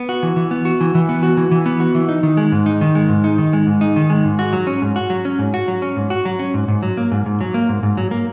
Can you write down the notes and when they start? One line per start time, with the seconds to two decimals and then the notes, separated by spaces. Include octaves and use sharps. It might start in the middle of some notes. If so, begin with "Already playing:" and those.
Already playing: B3
0.09 F#4
0.23 E3
0.36 E3
0.51 B3
0.65 F#4
0.81 E3
0.95 E3
1.09 B3
1.23 F#4
1.37 E3
1.51 E3
1.66 B3
1.80 F#4
1.95 E3
2.09 D#4
2.23 D#3
2.37 G#3
2.52 G#2
2.66 D#4
2.81 D#3
2.95 G#3
3.09 G#2
3.24 D#4
3.38 D#3
3.53 G#3
3.67 G#2
3.81 D#4
3.96 D#3
4.10 G#3
4.24 G#2
4.39 F#4
4.53 F#3
4.67 C#4
4.82 G#2
4.96 F#4
5.10 F#3
5.25 C#4
5.39 G#2
5.54 F#4
5.68 F#3
5.82 C#4
5.97 G#2
6.10 F#4
6.25 F#3
6.39 C#4
6.54 G#2
6.68 G#2
6.83 F#3
6.97 A#3
7.11 G#2
7.26 G#2
7.41 F#3
7.54 A#3
7.69 G#2
7.83 G#2
7.97 F#3
8.11 A#3